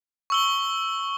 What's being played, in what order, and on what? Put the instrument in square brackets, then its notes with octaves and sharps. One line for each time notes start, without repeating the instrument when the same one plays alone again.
[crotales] C#6 E6 G7